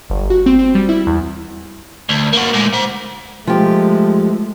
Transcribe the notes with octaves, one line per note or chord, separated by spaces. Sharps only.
G1
F#4
C4
C4
G3
E4
E2
D2
A#3 F#4
A#2 G#3
C5 F#5
F3 G#3 A3 G4